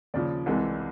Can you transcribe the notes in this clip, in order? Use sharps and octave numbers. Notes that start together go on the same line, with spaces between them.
D#2 C#3 F3 D5
C2 C3 E3 G#3